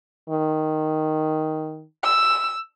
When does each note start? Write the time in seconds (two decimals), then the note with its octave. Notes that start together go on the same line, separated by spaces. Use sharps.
0.29 D#3
2.04 E6